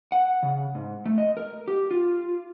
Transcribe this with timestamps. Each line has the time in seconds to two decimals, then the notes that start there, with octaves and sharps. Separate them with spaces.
0.12 F#5
0.43 C#3
0.75 G#2
1.06 A3
1.18 D#5
1.37 A#4
1.68 G4
1.91 F4